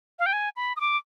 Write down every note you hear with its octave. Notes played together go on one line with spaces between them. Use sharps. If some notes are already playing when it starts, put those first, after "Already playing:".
F5
G5
G#5
B5
D#6
D6